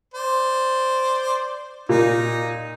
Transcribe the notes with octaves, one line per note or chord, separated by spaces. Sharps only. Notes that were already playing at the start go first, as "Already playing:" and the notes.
C5 D5
A#2 D#4